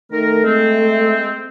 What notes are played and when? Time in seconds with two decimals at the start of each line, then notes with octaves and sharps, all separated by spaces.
0.12 D#3 A3 A#4
0.44 G#3 C4